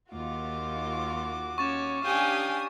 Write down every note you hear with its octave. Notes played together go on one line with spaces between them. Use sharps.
D#2 F4 F#4 D6
C#4 C#5 C#6 A6 E7
C#4 D4 G4 F5 G5 G#5 D#6